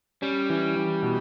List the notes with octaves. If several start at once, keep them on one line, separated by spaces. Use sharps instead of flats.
G3 C#4
E3
E3
B2